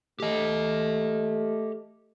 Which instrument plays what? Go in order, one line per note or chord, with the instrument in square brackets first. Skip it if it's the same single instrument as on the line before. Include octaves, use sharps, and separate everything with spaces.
[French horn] A3 [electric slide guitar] G4 D#5